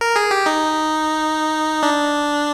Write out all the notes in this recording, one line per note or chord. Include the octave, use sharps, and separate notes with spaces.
A#4
G#4
G4
D#4
D4